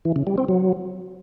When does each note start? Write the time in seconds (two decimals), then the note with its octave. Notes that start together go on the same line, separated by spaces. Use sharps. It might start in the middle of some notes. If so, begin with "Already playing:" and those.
0.05 E3
0.16 C#3
0.27 G3
0.38 C4
0.48 F#3